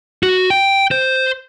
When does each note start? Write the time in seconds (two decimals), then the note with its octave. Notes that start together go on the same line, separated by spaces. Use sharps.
0.23 F#4
0.50 G5
0.91 C5